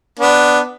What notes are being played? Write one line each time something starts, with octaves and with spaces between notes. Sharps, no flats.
B3 D4